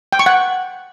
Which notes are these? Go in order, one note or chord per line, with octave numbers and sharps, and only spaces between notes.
G5
C#6
F#5